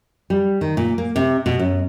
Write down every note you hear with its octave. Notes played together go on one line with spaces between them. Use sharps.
G3
D#3
A#2
A#3
C3
B2
F#2